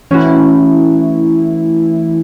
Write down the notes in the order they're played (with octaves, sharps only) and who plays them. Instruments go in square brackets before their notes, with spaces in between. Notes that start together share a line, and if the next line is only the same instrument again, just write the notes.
[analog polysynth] E3 A3 E4 [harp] C#4 F#4